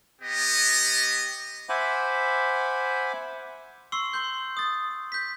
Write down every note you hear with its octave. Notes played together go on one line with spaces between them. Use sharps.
B3 G4 D#5
C5 E5 F#5 G#5 B5 D6
C6 C#6 E6 C7
C6 G6
D#6 A6
G6 B6